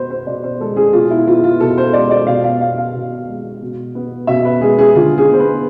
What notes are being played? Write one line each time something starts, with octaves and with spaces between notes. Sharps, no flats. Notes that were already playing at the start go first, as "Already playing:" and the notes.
Already playing: B2 B3 B4 C5
C5
B2 D5
C5
G#3 A4
G#4
B2 F4
E4
B3 F4
F4
B2 A4
C5
G#3 D5
D5
B2 F5
F5
B3 F5
F5
B2
G#3
B2
B3
B2 E5
B4
G#3 G#4
G#4
D3 F4
G#4
B3
C5
B4